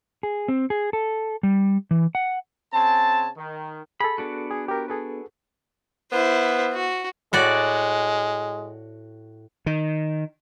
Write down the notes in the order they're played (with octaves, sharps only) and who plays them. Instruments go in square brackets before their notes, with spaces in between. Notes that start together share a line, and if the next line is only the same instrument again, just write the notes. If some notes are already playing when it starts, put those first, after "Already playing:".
[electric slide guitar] G#4
C4
G#4
A4
G3
E3
F#5
[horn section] C#3 C4 G#5 A5
D#3
[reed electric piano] G#4 A4 [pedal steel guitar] B5
[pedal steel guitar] B3 D4 F#4
[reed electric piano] G#4
G4 A#4
G#4 A4 B4
[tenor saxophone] B3 [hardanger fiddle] E4 C5
[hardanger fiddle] F#4
[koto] A2 F#4 D5 [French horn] G#3
[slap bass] D#3